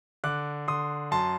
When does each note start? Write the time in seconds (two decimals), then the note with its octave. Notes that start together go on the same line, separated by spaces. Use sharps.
0.24 D3 D6 F#6
0.68 D3 C6 D#6
1.11 F#2 A5 C6